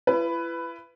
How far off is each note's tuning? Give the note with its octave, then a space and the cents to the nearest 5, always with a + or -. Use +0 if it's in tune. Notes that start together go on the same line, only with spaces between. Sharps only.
E4 +40 B4 +10